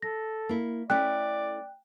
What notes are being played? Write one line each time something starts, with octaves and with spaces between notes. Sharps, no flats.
A4 A#6
A#3 E4
A3 C#4 E4 D5 G5 F#6